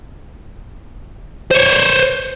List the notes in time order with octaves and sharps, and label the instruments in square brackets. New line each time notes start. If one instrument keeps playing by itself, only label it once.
[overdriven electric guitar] C5 C#5